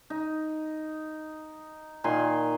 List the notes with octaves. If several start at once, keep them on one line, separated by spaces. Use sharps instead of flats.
D#4
A#2 D#3 G#5 C6